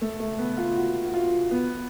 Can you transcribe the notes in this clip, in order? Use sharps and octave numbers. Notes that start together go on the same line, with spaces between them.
A3
A3
B3
F4
F#4
F#4
F4
B3